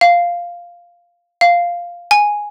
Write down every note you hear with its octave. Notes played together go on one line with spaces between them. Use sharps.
F5
F5
G#5